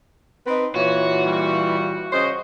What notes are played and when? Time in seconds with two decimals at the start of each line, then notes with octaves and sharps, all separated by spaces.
0.47 C4 D#4 B4
0.75 A#2 E3 F4 F#4 C#5
1.25 G3
2.12 C#3 C5 D#5